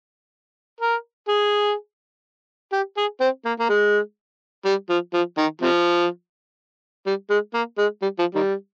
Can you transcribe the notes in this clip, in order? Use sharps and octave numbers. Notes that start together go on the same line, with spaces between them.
A#4
G#4
G4
G#4
C4
A#3
A#3
G#3
G3
F3
F3
D#3
C3 F3
G3
G#3
A#3
G#3
G3
F3
D#3 G3